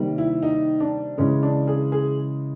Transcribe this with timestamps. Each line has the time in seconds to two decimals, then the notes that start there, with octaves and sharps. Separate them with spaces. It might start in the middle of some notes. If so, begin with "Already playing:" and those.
Already playing: C3 D#3 G3 A#3
0.18 E4
0.43 D#4
0.80 D4
1.18 C#3 E3 G#3 C#4
1.43 D4
1.68 G#4
1.92 G#4